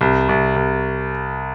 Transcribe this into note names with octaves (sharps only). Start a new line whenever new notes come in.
C2
C2
C2